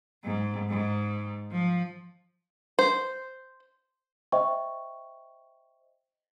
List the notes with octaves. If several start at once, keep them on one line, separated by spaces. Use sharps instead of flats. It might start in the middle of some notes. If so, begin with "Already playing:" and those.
G#2
G#2
F3
C5
C5 D#5 E5 G5 C#6